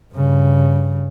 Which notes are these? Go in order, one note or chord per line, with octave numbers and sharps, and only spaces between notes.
G2 C#3